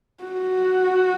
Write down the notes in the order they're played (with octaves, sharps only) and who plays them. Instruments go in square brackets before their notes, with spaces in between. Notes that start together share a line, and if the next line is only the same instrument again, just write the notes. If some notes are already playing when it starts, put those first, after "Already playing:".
[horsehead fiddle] F#4